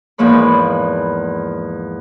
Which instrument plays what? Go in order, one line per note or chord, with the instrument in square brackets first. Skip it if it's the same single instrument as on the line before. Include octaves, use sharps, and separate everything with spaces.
[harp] E2 G#2 F3 A#3 C#5 B5